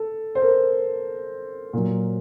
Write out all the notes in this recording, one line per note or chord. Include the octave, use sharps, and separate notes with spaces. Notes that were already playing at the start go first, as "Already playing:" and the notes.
Already playing: A4
C5
A#4
A#2 F#3